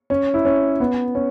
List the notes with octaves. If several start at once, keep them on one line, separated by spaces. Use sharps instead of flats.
C#4
E4
C#4
B3
C#4